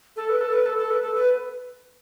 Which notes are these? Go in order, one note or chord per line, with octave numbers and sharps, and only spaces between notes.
A4
B4
A4
B4
A4
A4
B4
A4
B4